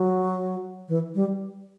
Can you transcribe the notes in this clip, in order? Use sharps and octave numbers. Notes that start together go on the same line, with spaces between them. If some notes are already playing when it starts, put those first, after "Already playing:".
Already playing: F#3
E3
G3